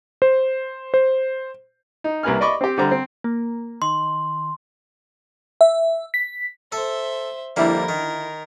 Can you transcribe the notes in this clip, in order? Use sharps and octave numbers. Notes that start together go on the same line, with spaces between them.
C5
C5
D#4
C2 A#3 B4 G#5 F6
D5 D#5 B5 C#6 D6
C4 G4
D3 G3 C5 A#5
C4
A#3
D#3 C6
E5
B6
A4 C5 E5
F2 D3 G3 A#3 E4 A#4
D#3